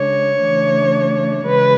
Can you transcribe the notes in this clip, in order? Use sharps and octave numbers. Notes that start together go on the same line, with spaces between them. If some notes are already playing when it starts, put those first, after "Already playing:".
Already playing: C#3 G#3 D4 C#5
C#3 E3 A3 D4
C#3 E3 G#3 B4